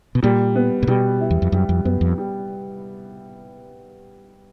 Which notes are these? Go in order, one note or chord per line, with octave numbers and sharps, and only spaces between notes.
B2
A#2 G3
B3
A#2
B2 G3
E4
E2
F2
F#2 G3
F2
F#2 B3
F2
G3